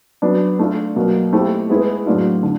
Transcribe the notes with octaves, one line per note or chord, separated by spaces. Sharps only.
F#3 B3 D4
A3 D4 F4
B2 F#3 A#3
A3 C4 E4 G4
G#3 B3 E4 G#4 B4
A2 F#3 A3 D4 F4
D3